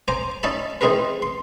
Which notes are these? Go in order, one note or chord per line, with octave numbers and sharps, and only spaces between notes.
C5 G#5 A#5 D6
C#4 D#4 D5 E5 A5 B5
E3 C4 D#4 G#4 A#4 B4
C6